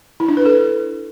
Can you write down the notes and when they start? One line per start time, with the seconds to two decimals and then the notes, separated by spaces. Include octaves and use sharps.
0.20 E4
0.29 D4
0.37 B4
0.46 A4